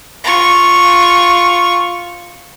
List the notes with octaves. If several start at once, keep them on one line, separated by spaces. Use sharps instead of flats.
F4 C#6